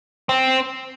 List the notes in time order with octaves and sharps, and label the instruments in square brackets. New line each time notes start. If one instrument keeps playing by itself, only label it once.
[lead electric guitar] C4